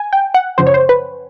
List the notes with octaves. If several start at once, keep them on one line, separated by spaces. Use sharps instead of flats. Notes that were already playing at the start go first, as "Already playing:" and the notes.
Already playing: G#5
G5
F#5
F#2 C#3 F3 C5
C#5
C5
B4